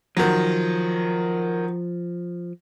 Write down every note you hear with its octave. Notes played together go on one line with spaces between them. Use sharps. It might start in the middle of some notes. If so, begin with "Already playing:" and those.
D#3 F3 F#3